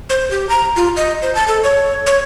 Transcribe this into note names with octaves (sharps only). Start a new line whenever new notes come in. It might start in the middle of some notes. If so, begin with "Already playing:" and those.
C5
G4
A#5
F4
D#5
C5
A5
A4
C#5
C#5